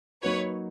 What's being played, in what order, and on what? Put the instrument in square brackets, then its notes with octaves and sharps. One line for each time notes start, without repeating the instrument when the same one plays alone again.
[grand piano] F#3 A#3 D#4 F#4 [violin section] B4 C#5